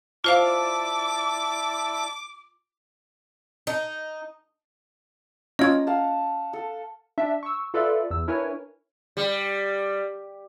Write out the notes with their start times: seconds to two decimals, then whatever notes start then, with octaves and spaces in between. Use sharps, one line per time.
0.24 E4 F4 C5 D5 F5 A5 D6
3.67 D#4
5.59 C#4 F4 D#5 A#5 G#6
5.87 F5 F#5 A5
6.53 A4
7.18 D4 E5 A5
7.43 C#6 E6
7.74 F4 A4 B4 D5 E5
8.10 E2 E6
8.27 D4 E4 A#4 B4 C#5 G#5
9.17 G3